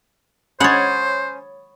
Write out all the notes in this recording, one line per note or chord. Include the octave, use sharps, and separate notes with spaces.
C#4 C5 C#5 F#5 B5 D#6 A6